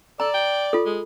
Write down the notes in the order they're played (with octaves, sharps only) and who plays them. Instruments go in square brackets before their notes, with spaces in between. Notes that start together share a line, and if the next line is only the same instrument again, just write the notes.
[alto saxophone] A4 [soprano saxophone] D5 [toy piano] A#5
[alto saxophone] G5
[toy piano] F4 A4
[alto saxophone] G#3